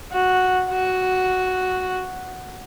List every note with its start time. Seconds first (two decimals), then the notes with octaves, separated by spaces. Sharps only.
0.12 F#4
0.70 F#4